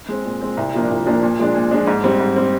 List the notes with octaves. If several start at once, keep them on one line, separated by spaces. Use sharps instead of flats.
G#3 C4
A#2
G#3 C4
C2
A#2 F3 A#3 D4
C2
A#2 F3 A#3 D4
A#2
F3 G#3 D4
A#2
F3 G#3 D4
G#2
G3 C4
G#2
G3 C4